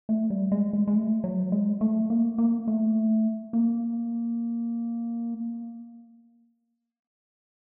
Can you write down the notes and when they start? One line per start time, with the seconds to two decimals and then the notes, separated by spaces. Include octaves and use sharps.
0.09 A3
0.30 G3
0.52 G#3
0.73 G#3
0.87 G#3
0.95 A3
1.24 F#3
1.52 G#3
1.81 A3
2.10 A#3
2.38 A#3
2.68 A3
3.53 A#3